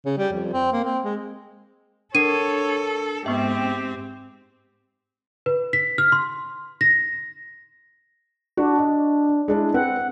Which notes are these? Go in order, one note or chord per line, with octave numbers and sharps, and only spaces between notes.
C#3
G3
F2
C4
A#3
C4
G#3
D4 A4 A#4 C#5 C7 D#7
G#2 B3 C4 G4 E5
B4
B6
F6
C6
A#6
D4 F#4
D#5
G#3 D4 E4
C4 B4 F#5